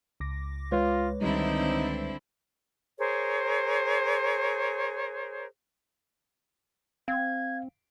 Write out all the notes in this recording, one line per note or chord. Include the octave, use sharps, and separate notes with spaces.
C#2 D6 A#6
G#3 F4 B4 C#5
C#2 D3 D#3 G3 C4 D#4 E4
G#4 A#4 C5 C#5
C4 F5 G#6